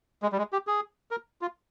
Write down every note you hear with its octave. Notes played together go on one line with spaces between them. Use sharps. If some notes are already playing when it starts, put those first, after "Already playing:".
G#3
G3
G#3
G4
G#4
A#4
F4